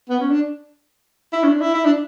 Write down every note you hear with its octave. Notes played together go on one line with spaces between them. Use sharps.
B3
C#4
D4
E4
C#4
D4
E4
E4
D4